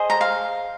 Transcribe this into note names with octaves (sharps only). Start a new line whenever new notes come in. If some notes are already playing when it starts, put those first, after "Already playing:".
Already playing: G#4 C5 D#5
A#5
F5